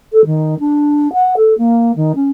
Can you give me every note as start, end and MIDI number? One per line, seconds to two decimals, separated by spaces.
0.12 0.25 69
0.25 0.58 51
0.59 1.12 62
1.13 1.34 78
1.37 1.54 69
1.58 1.92 58
1.96 2.12 51
2.15 2.31 61